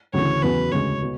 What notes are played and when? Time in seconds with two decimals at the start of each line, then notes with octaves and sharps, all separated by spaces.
0.13 D2 C#3 E3 C#5
0.42 E2 C#3 F#3 B3 E4 B4
0.72 D2 C#3 G#3 C#5
1.02 B2